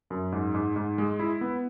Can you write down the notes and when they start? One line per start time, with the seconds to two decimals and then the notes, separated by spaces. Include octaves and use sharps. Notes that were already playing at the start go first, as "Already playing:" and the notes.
0.10 F#2
0.32 G#2
0.54 G#2
0.76 G#2
0.98 G#3
1.19 E4
1.41 B3